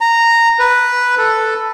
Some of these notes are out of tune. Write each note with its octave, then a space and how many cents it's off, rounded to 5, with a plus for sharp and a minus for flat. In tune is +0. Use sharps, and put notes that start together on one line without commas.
A#5 -10
B4 -5
A4 +5